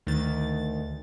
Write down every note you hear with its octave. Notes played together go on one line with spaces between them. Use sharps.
D2 D#3 A6